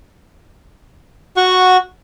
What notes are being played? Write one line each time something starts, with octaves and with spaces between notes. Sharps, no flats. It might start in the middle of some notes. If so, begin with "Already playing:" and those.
F#4 F#5 C#6